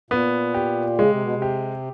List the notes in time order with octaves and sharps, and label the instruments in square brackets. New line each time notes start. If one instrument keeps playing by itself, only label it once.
[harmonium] A#2 [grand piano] B3
[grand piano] G4
[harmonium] C#3 [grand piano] G#3
[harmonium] C3
B2
C3
[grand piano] G4